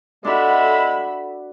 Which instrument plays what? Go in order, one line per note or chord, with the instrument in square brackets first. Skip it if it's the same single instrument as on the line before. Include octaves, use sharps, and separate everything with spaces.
[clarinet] G#3 [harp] D4 F#4 [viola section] A4 E5 B5